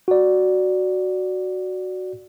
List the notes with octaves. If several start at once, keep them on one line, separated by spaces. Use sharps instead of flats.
F#4 D5